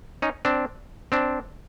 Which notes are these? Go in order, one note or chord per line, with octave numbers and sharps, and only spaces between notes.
C#4 D#4
C4 D4
C4 D4